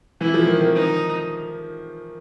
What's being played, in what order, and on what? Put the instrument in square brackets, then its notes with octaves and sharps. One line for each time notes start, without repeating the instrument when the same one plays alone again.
[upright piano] E3 [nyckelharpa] E4
[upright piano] F3
D#3
D#3
[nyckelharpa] D#4